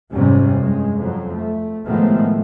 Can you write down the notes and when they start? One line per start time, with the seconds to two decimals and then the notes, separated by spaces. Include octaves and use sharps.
0.11 F2 G#2 C3 G3 C#4
0.56 G2 G#3
0.98 F2 F#3
1.33 A3
1.87 A2 D#3 F3 G#3 A3 B3